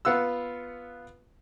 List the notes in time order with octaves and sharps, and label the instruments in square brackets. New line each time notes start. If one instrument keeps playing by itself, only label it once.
[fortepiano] B3 F4 F#5 E6